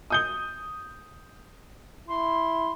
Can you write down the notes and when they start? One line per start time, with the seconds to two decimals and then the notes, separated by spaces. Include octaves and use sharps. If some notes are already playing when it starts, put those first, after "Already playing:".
0.10 D#6 G6 G7
2.08 E4 C6